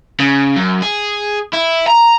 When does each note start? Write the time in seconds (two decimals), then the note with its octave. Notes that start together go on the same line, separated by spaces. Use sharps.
0.20 C#3
0.56 F#2
0.82 G#4
1.53 E4
1.87 A#5